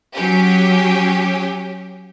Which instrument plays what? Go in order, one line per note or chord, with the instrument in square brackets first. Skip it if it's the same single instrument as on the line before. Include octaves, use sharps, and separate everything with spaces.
[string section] F#3 C#4 G4